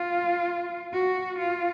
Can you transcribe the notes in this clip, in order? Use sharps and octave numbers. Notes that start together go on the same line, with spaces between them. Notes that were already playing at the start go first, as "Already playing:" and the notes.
Already playing: F4
F#4
F4